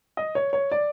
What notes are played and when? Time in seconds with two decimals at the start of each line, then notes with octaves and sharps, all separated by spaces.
0.17 D#5
0.35 C#5
0.53 C#5
0.71 D5